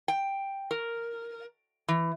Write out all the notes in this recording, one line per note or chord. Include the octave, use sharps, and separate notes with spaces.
G5
A#4
E3